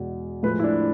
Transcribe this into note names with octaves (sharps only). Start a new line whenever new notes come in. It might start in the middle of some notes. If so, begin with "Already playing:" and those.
Already playing: E2 B2 G#3
A2 F3 G#3 B4
E4
D4